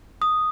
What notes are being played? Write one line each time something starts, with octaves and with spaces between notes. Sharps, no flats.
D#6